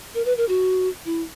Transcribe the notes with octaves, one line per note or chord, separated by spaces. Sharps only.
A#4
B4
A#4
F#4
E4